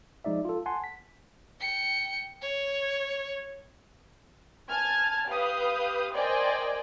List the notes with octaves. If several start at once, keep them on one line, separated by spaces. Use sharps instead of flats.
F3 G#3 D#4 D5 E5
F4 A4
F#5 G#5 A5 C6
B6
G5 C#7
C#5
G#5 A5 F6 G#6
G4 B4 F5 D#6 G6
A#4 C5 D5 D#5 G5 G#5